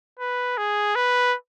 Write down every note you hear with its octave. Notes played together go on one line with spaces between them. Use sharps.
B4
G#4
B4